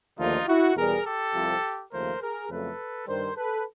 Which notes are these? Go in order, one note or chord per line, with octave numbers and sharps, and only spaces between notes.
D#2 D3 F3 A3 D#4 F4
E4 F#4
E2 B2 G3 G#4 A#4
G4 A4
C2 C3 F3
D#2 C#3 F3 A3 A#4 C5
G#4 A#4
F2 C#3 F#3 A3 A4 B4
G2 D#3 G3 A#4 C5
A4 B4